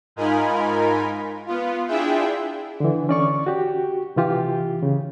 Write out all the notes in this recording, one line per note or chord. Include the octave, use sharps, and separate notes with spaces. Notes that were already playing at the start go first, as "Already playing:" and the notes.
G#2 D#4 F4 A#4 G#5 B5
B3 F4
D4 E4 F4 G#4 E5 G5
D3 E3
C#4 D5 C#6
F#4 G4
C3 E3 F4 G4
C#3